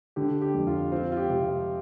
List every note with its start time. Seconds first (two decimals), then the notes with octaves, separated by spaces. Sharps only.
0.16 D3 G4
0.42 G4
0.54 F2
0.67 F4
0.92 C4 F4
1.12 F4
1.17 G4
1.30 C3
1.42 F4